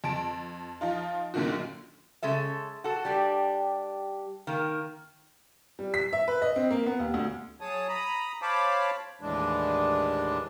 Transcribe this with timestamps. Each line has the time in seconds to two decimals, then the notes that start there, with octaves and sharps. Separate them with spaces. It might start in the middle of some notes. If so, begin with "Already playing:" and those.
0.04 F2 A5 D7
0.81 F3 D#4 F4
1.34 F#2 A#2 D3 D#3 A#3 F#4
2.23 C#3 G#3 A4 E5
2.84 F#4 A4
3.05 G3 D4 G4
4.47 D#3 A#3
5.79 G3
5.94 B6
6.13 E5
6.28 B4
6.42 D#5
6.56 C4
6.71 A#3
6.86 B3
6.99 D#2
7.14 D2
7.61 F#3 G#4 C#5 A5 D#6
7.88 A#5 B5 D#6
8.42 C5 C#5 F5 A5 B5 D6
9.21 D#2 A2 E3 G#3 D4